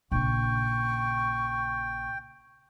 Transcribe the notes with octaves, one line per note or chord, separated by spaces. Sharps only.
A#1 C#3 G5 C#6